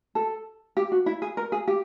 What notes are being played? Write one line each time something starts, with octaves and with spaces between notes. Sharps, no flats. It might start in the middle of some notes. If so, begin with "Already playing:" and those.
A4
G4
F#4
E4
G#4
A#4
G#4
G4